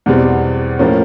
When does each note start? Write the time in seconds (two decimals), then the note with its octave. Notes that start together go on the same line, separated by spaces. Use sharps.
0.06 E2 B2 G3 C4
0.79 A2 F3 A#3 C#4